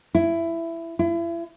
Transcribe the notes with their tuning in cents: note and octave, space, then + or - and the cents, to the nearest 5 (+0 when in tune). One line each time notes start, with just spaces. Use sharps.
E4 +15
E4 +35